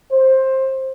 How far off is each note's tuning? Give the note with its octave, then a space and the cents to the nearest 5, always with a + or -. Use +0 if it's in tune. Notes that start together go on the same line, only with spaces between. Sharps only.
C5 +15